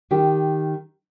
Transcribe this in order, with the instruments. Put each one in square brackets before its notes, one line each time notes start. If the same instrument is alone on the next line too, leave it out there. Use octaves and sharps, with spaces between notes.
[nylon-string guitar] D#3 G4